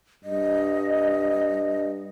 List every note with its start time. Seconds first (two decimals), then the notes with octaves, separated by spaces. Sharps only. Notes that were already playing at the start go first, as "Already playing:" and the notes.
0.24 G2 D#5